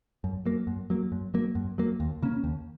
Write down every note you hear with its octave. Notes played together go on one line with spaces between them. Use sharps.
F#2
F#3 A#3
F#2
F#3 A#3
F#2
F#3 A#3
F#2
F#3 A#3
D#2
C#3 A#3 C#4
D#2